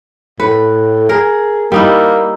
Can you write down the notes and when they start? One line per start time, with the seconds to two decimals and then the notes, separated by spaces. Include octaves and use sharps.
0.40 A2 B4
1.09 G#4 A#4
1.72 G3 A#3 D#4 E4